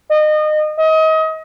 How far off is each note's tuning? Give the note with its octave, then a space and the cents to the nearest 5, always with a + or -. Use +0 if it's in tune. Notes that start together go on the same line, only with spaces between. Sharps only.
D#5 -30
D#5 +30